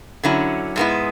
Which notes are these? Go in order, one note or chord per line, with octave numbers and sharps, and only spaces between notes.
D3 F#3 C#4 E4
G#2 G#3 B3 E4